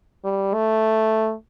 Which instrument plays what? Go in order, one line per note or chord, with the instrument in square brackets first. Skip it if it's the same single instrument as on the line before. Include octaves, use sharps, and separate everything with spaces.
[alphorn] G3
A3